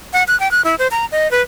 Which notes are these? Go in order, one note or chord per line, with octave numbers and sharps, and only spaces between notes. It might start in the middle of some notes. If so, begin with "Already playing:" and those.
F#5
F#6
G5
F#6
E4
C5
A#5
D#5
B4